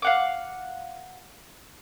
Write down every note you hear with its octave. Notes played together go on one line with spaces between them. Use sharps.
F5 F#5 D6